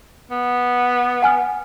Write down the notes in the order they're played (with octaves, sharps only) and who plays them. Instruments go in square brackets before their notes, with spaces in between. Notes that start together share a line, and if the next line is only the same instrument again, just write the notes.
[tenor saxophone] B3
[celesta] F#5 G#5 F6